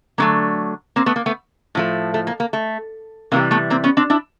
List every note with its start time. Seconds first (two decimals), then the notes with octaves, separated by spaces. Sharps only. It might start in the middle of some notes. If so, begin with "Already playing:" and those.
0.18 D3 F#3 A3 A#3
0.96 A#3 C4
1.06 A3 B3
1.16 A#3
1.26 A3 B3
1.75 A2 F3 A3
2.14 A3
2.27 A#3
2.40 A#3
2.53 A3
3.32 C3 E3 G3 A#3
3.51 A3 B3
3.70 A#3 C4
3.84 B3 C#4
3.97 C4 D4
4.10 D4 E4